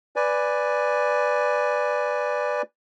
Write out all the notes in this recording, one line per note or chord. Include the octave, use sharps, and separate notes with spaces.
B4 D5 G#5